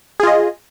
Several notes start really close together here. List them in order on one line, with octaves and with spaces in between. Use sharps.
G#4 F4 D#5